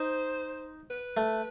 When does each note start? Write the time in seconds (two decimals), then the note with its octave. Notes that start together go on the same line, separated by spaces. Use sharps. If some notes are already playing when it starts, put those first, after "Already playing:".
Already playing: D#4 C5
0.90 B4
1.17 A3